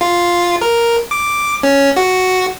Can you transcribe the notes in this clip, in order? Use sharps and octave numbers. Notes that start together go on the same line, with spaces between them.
F4
A#4
D6
C#4
F#4